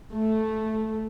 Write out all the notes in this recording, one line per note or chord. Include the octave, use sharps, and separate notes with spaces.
A3